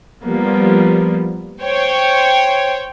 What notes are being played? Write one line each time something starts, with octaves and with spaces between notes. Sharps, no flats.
F3 G3 A#3 B3
C5 C#5 G5